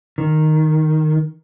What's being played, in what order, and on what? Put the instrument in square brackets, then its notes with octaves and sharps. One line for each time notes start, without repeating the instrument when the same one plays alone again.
[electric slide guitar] D#3